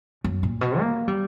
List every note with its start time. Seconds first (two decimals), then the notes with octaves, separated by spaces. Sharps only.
0.24 F#2
0.43 A#2
0.61 B2
0.79 A#3
1.08 G3